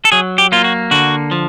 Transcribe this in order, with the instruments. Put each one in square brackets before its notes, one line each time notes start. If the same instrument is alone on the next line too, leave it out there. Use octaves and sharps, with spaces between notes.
[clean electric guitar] A4
F#3 G#4
G4
A#3 F4
F#4
D3 F#4
F3